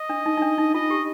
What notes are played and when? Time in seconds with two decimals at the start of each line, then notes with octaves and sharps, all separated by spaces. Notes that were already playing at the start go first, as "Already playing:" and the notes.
Already playing: D#5
0.09 D4
0.26 D#4
0.37 D#4
0.42 D4
0.58 D#4
0.74 F4 D#5
0.90 G4